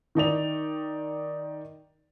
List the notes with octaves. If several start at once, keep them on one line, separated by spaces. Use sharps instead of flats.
D#3 D#4 D5 F7